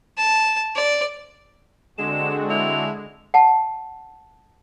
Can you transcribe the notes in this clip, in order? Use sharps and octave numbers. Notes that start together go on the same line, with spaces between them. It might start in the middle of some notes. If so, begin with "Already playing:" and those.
A5
D5
D3 G#3 C4 D4 F#4 E7
E4 F7
F#5 A5